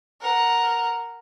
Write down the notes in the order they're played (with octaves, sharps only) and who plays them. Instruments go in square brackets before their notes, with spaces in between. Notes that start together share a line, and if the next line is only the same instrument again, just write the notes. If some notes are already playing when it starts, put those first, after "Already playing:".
[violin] A#4 F#5